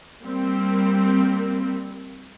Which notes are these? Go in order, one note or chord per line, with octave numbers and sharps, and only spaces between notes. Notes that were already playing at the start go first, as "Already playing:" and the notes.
G3 A#3 C4